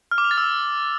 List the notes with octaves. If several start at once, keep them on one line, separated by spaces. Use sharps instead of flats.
F6
D6
F7
A6
E6